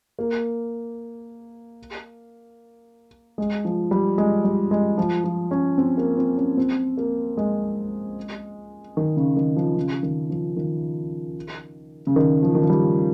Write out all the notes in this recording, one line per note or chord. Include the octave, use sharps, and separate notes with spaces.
A#3
G#3
F3
G3
G#3
G3
G#3
F3
F3
C#4
C4
A#3
C4
C#4
C4
A#3
G#3
D#3
C#3
D#3
F3
C#3
D#3
F3
D#3
C#3
D#3
F3
D#3
F3
G3